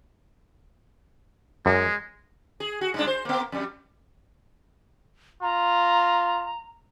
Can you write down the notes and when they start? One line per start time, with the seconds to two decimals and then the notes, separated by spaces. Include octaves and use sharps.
1.66 F#2 G#3
2.60 G#4
2.81 F#4
2.94 G2 G#3 D4
3.07 C5
3.25 A#3 B3
3.52 F2 G3
5.42 F4 A#5